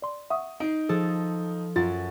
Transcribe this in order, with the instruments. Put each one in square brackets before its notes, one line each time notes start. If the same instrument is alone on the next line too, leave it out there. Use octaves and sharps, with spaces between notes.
[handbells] D5 C6
[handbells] E5 F#5 C#6 [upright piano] D#6
[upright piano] D#4 [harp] C7 D7
[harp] F3 A4 D#6 [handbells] G#4
[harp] F#2 [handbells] F4 [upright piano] A6